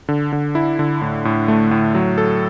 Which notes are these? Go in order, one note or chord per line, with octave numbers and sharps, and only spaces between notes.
D3
D3
E4
D3
A2
A2
A3
A2
F#3
A4